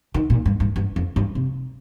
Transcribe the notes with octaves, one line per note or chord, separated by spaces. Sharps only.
D#3
A#2
G2
G2
G2
F2
G2
C3